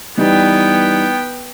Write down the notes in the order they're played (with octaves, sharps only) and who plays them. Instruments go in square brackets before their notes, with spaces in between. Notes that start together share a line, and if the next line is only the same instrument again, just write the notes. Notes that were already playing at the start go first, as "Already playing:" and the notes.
[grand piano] E3 G3 D#4 [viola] B3 G5